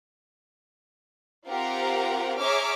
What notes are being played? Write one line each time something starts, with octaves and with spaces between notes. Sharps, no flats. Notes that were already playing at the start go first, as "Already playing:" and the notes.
C4 F4 G4 A#4 F#5 A#5
G#4 C#5 E5 A#5 D6 F6